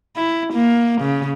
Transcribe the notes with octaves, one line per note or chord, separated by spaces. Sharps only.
E4
A#3
C#3